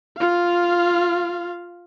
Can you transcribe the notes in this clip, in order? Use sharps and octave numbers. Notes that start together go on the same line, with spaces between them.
F4 F5